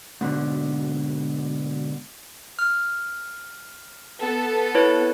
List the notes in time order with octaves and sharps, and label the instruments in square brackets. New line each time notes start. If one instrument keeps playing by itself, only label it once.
[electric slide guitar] G#2 B2 D3
[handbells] F6
[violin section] B3 A4
[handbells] E4 B4 C#5